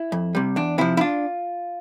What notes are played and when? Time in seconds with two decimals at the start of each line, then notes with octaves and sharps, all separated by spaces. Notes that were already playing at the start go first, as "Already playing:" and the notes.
Already playing: E4
0.12 F2
0.35 C3 G3
0.56 E2 D4
0.78 C3 F3 E4
0.97 E4
1.01 D4 F4